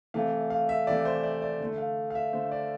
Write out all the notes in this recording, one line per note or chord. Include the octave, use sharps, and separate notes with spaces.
C3 E3 A3 F5
F5
E5
C3 E3 A3 D5
C5
D5
D5
D3 A3
F5
F5
E5
D3 A3 C5
D5